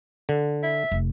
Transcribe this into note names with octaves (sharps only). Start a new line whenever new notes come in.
D3
E5
F1